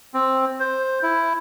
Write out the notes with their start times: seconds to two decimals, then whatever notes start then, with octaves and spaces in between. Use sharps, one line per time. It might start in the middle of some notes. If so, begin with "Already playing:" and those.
0.14 C4
0.60 C5
1.03 E4